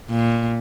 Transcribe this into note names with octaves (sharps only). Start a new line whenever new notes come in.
A#2